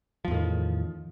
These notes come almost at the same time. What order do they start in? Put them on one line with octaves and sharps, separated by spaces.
F3 E2 A2 D#3